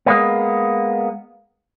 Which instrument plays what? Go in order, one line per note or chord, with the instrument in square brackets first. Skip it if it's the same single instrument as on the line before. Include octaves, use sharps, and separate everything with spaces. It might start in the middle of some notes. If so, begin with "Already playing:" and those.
[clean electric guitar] G#3 A#3 B3